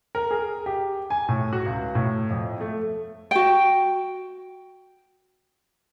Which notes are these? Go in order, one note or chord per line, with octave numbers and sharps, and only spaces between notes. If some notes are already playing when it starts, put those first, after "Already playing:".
A#4
G#4
G4
G#5
A2
F#4
C#2
A2
F2
A3
F#4 G5